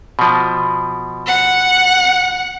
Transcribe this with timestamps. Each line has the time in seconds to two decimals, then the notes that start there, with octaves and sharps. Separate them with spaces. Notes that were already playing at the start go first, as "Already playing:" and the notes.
0.19 B2 F3
1.26 F#5